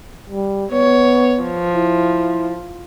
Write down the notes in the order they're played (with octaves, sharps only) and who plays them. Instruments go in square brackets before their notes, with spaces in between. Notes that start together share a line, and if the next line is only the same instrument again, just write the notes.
[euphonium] G3
[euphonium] B3 [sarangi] C#5
[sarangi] F3
[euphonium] E4